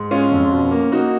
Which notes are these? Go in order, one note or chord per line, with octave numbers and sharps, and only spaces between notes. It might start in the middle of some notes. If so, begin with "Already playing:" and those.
Already playing: G#2
G#3 C#4 F4
F2
B2
A#3
A#3 D#4 F#4